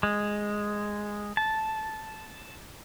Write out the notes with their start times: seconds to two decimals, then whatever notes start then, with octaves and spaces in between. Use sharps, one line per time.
0.03 G#3
1.37 A5